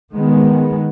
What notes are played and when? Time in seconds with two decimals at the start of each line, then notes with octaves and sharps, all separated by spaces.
0.13 D#3 G#3 B3